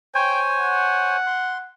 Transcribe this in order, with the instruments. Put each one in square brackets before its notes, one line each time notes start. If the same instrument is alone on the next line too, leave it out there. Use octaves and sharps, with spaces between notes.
[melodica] C5 C#5 G#5 [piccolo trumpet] G5
[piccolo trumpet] F#5
[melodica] C6